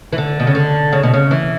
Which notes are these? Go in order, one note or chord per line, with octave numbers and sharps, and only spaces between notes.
E3
D3
B2
C#3
D3
C#3
B2
C#3
E3